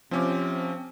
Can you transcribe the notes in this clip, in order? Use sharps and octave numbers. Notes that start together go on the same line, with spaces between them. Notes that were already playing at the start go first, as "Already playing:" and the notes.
C3 F3 C4 C#4 D6